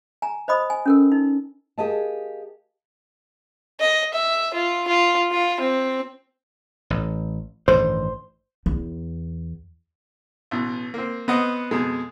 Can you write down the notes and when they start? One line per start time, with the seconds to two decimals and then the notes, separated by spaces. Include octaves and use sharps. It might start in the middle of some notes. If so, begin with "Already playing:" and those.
0.22 G#5 A#5
0.48 C5 D#5 B5 D#6
0.70 G#5
0.86 C#4 A4 A#4
1.12 D#4
1.78 G4 G#4 A#4 D#5 F5 A5
3.80 D#5
4.14 E5
4.54 F4
4.88 F4
5.32 F4
5.60 C4
6.90 A1
7.68 A1 G2 D#3 C5
8.66 E2
10.51 A1 B2
10.94 A#3 C4
11.28 B3 C4 D#5 F#5
11.71 F2 B2 G#3